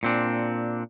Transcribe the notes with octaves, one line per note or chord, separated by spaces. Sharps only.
A#2 C4 D4